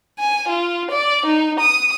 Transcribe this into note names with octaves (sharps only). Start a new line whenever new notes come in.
G#5
F4
D5
D#4
D#6